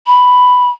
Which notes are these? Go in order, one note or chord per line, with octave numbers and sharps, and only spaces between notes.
B5